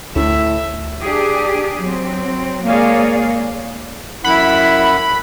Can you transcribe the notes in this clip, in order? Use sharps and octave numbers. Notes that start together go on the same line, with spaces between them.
D2 A2 E5
D4 G4 G#4
F#3 C4
G#3 A#3 G#4 C#5 D5 F5
F#2 E4 F#5 B5